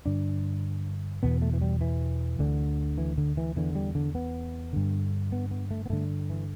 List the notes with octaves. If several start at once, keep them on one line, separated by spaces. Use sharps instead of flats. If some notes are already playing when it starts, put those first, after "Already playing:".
G2 D3 D4
E2 B2 B3
A3
E3
G3
E3
D2 D3
E3
D3
E3
E2 D3 E3
G3
D3
B3
G2 D3
B3
B3
A3
B3
G2 D3 A3
E3